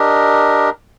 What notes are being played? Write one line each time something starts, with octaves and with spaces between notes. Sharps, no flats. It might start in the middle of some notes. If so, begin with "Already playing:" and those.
Already playing: D4 G4 A#4 D#5